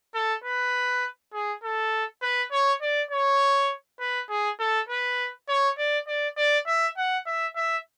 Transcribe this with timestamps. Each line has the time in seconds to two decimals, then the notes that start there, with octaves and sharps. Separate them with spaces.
0.14 A4
0.44 B4
1.33 G#4
1.63 A4
2.22 B4
2.52 C#5
2.82 D5
3.11 C#5
4.00 B4
4.30 G#4
4.60 A4
4.89 B4
5.49 C#5
5.78 D5
6.08 D5
6.37 D5
6.67 E5
6.97 F#5
7.27 E5
7.56 E5